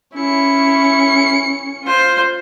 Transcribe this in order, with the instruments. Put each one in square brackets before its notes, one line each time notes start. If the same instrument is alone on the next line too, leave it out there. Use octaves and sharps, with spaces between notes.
[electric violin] C#4 C#7 [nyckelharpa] E4
[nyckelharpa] F4 C5